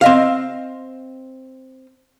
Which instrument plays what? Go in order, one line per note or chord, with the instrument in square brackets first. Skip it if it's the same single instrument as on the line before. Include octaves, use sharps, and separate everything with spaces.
[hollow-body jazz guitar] C4 D#5 F5